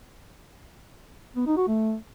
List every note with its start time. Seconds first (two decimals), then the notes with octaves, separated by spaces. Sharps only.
1.36 B3
1.47 D#4
1.57 F#4
1.67 A3